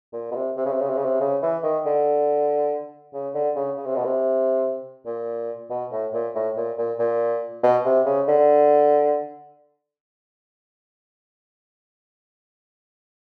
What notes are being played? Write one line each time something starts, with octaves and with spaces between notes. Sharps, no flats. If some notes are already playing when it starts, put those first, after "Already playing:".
A#2
B2
C3
C3
C#3
C3
C#3
C3
C#3
C3
C#3
E3
D#3
D3
C#3
D3
C#3
C#3
C3
B2
C3
A#2
B2
A2
A#2
A2
A#2
A#2
A#2
B2
C3
C#3
D3